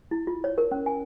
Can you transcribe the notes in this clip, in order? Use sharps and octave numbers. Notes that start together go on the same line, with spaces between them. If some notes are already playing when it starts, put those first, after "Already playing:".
E4
F4
C#5
A#4
C#4
G#5